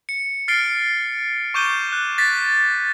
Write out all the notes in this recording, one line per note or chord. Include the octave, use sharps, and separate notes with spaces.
C#7
F6 A6 C7 D7 G7
C#6 D6 G6 D#7 G7
C#6 F#6
A6 B6